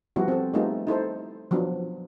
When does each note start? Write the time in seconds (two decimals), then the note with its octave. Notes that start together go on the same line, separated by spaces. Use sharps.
0.16 F3 G3 B3 E4 F#4
0.28 C4 A4
0.53 G3 A3 B3 D#4 F4 G#4
0.87 D#4 E4 A4 C5
1.51 F3 F#3 B3 D4